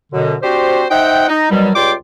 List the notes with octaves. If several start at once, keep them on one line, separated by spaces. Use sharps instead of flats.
F#2 B2 D3
C4 D4 F#4 G4 C5
D#4 C5 E5 F#5 G5
D#4
B2 D#3 F#3 G3
C#2 G3 F4 G5 C6 D6